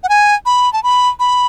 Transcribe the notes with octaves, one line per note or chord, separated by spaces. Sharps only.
F#5
G#5
B5
A5
B5
B5